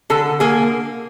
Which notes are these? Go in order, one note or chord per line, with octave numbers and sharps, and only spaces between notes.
D3 A4
A#3 G#4